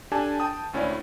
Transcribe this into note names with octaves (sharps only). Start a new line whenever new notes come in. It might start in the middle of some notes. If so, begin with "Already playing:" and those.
D4 G4 A4 G#5 A5
G5 A5 D#6
G#1 D2 C#4 E4 D5